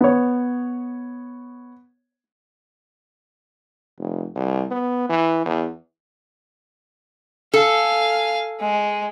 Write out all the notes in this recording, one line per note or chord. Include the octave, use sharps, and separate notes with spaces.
B3 C#5
F1
C2
B3
E3
E2
A4 F5 G#5
G#3